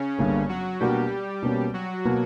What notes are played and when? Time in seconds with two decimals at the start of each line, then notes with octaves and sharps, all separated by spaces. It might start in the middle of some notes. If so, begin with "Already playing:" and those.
Already playing: C#3 C#4
0.19 G1 G2 D3 A#3
0.49 F#3 F#4
0.80 B2 G3 A#3 D4 F#4 G4 A#4
1.42 B2 A#3 C#4
1.73 F#3 F#4
2.05 B2 A#3